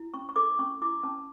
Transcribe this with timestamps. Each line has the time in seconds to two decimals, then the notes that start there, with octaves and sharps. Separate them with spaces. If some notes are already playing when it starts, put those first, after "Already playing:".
Already playing: E4
0.14 C#4 C#6
0.29 C#6
0.36 A4 D6
0.59 C#4 C#6
0.82 E4 D6
1.03 C#4 A5